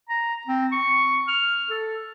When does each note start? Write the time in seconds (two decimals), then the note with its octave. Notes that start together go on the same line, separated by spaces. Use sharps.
0.09 A#5
0.47 C4
0.72 C#6
1.28 F6
1.70 A4